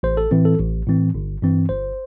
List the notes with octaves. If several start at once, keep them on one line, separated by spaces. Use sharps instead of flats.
A1 C5
A4
A2 E3 C4
A4
A1
A2 E3 C4
G1
G2 E3 C4
G1 C5